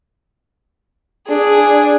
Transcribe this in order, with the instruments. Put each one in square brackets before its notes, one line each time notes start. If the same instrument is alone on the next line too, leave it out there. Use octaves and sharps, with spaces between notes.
[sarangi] D4 [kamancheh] G#4